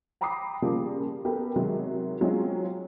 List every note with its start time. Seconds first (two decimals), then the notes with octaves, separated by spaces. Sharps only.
0.21 G5 A#5 B5 D6 D#6 C7
0.62 C#3 F3 G3 A#3
1.25 B3 F#4 G4 A4 A#4
1.56 C3 D#3 F#3 G#3
2.21 F#3 G#3 C4 C#4 F4